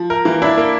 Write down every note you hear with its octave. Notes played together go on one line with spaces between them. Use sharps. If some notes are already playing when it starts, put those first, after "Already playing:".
Already playing: F3
A#4
E3 A#3
D4 E4
A#3